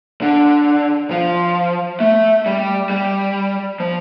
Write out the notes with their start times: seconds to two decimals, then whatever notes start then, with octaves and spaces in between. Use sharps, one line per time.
0.22 D3
1.11 F3
2.00 A3
2.46 G3
2.90 G3
3.80 F3